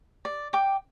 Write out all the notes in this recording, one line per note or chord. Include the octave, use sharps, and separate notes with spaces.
D5
G5 D6